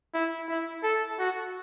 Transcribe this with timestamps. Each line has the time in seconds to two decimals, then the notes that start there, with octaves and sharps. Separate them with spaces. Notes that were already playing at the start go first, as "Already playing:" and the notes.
0.14 E4
0.49 E4
0.83 A4
1.19 F#4